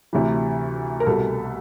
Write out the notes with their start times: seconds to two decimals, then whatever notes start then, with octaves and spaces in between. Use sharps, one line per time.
0.13 D2 C3 E3
1.00 A#4
1.06 C2 B2 A4